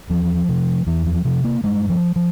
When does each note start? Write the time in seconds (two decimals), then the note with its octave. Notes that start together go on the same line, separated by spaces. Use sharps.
0.10 E2 F3
0.49 C3
0.87 E2 E3
1.07 F3
1.25 C3 F3
1.44 A#3
1.64 G2 G#3
1.90 F3
2.16 F3